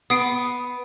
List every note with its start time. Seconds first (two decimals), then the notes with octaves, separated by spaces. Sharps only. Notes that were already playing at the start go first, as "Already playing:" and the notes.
0.10 B3 D#6 C7 D7